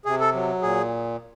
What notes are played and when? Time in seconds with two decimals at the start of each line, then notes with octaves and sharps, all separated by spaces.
0.05 C3 G#4
0.20 A4
0.34 F#3
0.62 A#2 G#4